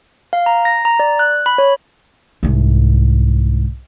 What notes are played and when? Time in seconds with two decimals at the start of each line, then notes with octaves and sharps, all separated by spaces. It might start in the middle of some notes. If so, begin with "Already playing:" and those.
0.33 F5
0.46 A#5
0.65 A#6
0.85 A#5
1.00 D5
1.19 F#6
1.46 B5
1.58 C#5
2.43 C2 G#2